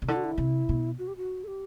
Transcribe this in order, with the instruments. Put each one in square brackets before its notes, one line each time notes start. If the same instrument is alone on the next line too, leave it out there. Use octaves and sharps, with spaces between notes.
[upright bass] C3
[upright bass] D3 [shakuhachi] E4
[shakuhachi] F#4
E4
[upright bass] C3
B2
[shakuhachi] F#4
G4
F#4
A4
G4